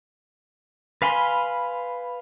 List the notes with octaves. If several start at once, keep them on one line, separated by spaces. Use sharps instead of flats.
B4 F5 G#5 B5 C6